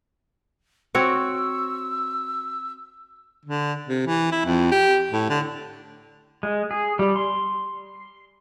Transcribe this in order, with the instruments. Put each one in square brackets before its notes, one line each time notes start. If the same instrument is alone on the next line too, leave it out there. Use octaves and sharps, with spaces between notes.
[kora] C4 F#4 C#5 [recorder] E6
[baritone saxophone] D3
C3
E3
E4
F2
G4
A2
D3
[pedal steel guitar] G#3
G#4
G3
C6